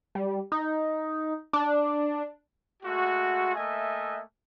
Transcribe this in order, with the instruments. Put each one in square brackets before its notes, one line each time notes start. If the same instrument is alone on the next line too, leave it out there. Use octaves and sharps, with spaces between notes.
[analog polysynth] G3
D#4
D4
[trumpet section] G#3 A3 F#4
A3 A#3 D#5 E5 G#5